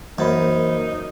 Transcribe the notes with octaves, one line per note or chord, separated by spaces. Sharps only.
F#2 E3 A#3 D#4 C5 B5